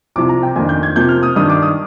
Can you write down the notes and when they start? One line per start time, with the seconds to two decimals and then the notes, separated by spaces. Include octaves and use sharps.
0.16 C2 C3 F3 D6
0.29 A#5
0.43 G5
0.56 F2 D#3 A#3 D4 G#5
0.69 G6
0.83 G#6
0.96 C3 F3 A#3 G6
1.09 F6
1.23 D#6
1.36 G2 D#3 G3 D4 D#6
1.50 D6
1.62 D#6